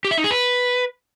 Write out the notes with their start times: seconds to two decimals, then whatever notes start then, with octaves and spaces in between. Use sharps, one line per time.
0.05 G4
0.11 E5
0.18 D#4
0.24 G#4
0.31 B4